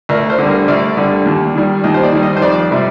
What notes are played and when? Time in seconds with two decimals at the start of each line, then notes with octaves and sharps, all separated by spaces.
0.09 D2 A#4
0.30 C5
0.38 D3 G3
0.48 A#4
0.68 D2 D5
0.97 D3 G3
1.26 D#2
1.55 D#3 G3
1.84 D#2 D#5
1.94 C5
2.03 D5
2.12 D#3 G3
2.23 D#5
2.36 C5
2.42 F2 D5
2.71 C3 G3